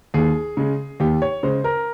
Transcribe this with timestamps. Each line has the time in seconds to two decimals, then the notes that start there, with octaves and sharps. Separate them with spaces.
0.14 D#2 G#4
0.57 C#3 G#3
1.00 D#2 G4
1.22 C#5
1.43 C#3 G#3 C5
1.64 A#4